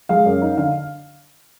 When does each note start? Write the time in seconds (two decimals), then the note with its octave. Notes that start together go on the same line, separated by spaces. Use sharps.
0.09 G#3 F5
0.26 F#2
0.42 D#4
0.57 D3 F5